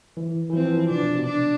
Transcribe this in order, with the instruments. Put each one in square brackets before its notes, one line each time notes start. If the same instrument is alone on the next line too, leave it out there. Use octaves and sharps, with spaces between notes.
[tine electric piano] E3
E3
[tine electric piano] F3 [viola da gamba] C4
[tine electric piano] F3
E3
[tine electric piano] C3 [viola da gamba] D4
[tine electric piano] B2
B2
[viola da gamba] D4